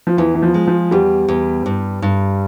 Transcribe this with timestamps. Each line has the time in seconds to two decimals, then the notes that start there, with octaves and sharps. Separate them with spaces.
0.07 F3
0.17 E2 E3
0.35 E3
0.42 F3
0.54 G#3
0.67 F3
0.91 E2 G3
1.28 E2
1.66 G2
2.02 G2